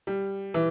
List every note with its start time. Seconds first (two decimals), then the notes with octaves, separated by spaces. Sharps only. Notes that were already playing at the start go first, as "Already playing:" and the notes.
0.07 G3
0.54 E3